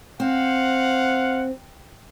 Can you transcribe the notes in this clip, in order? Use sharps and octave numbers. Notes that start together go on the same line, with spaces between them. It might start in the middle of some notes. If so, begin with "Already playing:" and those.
C4 C5 F5 F#5